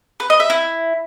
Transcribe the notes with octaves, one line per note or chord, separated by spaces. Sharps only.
B4
D#5
E5
E4